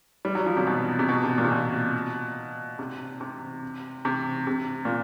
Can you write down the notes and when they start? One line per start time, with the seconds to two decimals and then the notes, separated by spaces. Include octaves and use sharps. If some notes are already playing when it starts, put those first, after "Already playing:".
0.25 G3
0.35 F#3
0.46 F3
0.57 C3
0.67 B2
0.99 C3
1.09 B2
1.24 C3
1.38 A#2
1.44 C3
1.51 B2
2.79 C3
3.21 C3
4.05 C3
4.47 C3
4.85 A#2